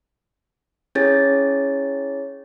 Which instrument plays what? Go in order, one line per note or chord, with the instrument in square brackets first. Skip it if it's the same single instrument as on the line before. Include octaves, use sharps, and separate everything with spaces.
[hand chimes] C#4 E4 G#4 C#5 A6